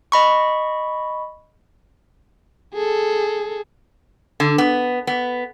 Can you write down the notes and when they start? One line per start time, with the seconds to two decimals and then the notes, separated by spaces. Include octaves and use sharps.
0.12 D#5 B5 C#6
2.74 G#4 A4
4.40 D3
4.58 B3
5.07 B3